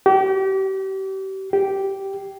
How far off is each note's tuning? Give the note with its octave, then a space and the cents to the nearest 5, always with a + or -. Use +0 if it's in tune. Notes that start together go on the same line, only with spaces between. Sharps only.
G4 -35
G4 -10